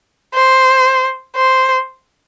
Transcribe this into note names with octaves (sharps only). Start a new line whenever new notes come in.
C5
C5